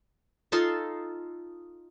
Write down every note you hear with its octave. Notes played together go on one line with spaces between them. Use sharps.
D#4 F4 A4 C6